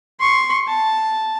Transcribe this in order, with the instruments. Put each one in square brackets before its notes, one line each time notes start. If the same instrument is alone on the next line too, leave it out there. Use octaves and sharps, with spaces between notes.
[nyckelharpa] C6 C#6
A5